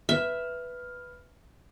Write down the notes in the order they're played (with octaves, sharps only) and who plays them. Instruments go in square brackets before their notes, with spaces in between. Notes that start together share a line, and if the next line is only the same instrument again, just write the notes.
[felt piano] B4 F6 [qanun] E5